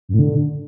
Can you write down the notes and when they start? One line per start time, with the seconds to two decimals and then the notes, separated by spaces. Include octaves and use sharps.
0.09 F#2
0.14 A2
0.19 D3